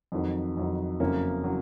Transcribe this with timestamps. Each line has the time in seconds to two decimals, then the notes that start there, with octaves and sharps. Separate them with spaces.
0.12 F2 D#3 F#3
0.57 F2 D#3 F#3
1.00 F#1 F2 C#3 F#3 A#3 C#4
1.44 C#3 F#3